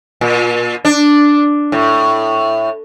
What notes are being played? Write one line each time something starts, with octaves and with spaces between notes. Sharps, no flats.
A#2
D4
A2